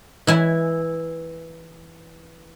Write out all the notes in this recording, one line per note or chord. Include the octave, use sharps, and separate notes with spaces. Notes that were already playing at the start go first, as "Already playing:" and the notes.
E3 E4 G#5